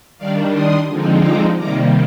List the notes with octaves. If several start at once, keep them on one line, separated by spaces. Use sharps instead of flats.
D#3 G3 D4 D5 F5
C6 D#6
D3 F3 G#3 C4 D#4
A#5 D6
C3 D#3 G3 A#3 A#5 D6